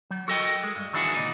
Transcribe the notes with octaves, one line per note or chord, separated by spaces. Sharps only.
F#3
F#4 A4 A#4 D#5 G5
G#3
G2
D#3 E3 D4 E4 F#4 G#4
C#2 A#2 D#4